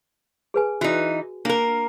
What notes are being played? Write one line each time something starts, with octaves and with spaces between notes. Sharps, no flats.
G#4 B4 G#5
E3 D#4 F#4
A#3 D4 A#4 F5